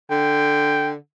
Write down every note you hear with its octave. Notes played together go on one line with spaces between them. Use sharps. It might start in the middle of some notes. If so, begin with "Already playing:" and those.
D3 G5